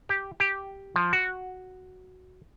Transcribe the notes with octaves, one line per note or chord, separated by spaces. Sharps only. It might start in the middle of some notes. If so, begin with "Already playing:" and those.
G4
G4
F3
F#4